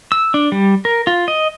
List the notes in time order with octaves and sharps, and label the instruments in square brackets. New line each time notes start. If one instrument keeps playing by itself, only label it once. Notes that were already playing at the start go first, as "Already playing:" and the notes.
[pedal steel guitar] E6
D4
G3
A#4
F4
D#5